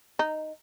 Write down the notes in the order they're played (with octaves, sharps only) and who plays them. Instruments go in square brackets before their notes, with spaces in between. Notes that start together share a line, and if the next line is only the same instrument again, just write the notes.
[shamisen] D#4